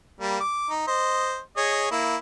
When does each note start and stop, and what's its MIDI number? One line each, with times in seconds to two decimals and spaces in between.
0.20 0.38 55
0.20 0.38 58
0.40 0.70 86
0.70 0.83 63
0.88 1.39 72
0.88 1.39 75
1.57 1.87 68
1.57 1.87 73
1.57 1.87 75
1.91 2.16 58
1.91 2.16 64